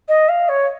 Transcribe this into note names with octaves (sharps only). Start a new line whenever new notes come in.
D#5
F5
C#5